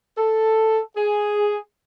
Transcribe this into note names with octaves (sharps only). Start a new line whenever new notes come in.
A4
G#4